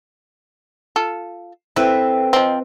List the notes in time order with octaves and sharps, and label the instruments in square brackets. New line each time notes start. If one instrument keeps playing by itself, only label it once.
[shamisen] F4 A4
[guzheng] C4 B4 E5 [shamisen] E4 [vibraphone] A4 G5
[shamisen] F3 C4 [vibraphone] D#5